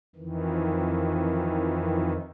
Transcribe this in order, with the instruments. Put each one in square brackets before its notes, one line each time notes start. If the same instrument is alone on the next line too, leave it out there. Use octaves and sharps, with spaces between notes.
[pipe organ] F2 D#3 E3